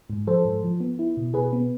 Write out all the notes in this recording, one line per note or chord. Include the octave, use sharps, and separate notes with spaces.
G#2
F3 A4 C5
G#2
F3
B3
E4
B2
B2 G#4 B4
B3